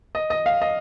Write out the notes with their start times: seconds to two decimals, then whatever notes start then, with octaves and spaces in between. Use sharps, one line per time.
0.15 D#5
0.30 D#5
0.46 F5
0.62 D#5